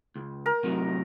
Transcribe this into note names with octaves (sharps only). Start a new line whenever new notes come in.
C#2
A#4
A2 C3 F#3